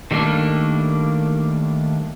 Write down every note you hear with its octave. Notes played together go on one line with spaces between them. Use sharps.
D#3 G3 A3 A#3 D4